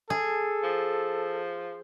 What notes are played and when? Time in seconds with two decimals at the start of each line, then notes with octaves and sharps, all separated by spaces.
0.10 G#4 A4
0.63 F3